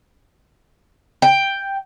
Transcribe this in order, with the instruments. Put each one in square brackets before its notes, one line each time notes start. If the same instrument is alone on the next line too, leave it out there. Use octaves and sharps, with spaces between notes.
[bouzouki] G5